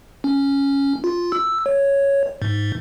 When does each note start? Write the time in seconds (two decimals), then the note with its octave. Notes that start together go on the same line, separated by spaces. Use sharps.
0.24 C#4
1.04 F4
1.32 E6
1.66 C#5
2.42 G#2